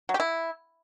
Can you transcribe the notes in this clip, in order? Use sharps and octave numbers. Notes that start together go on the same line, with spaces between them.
F#3
G4
E4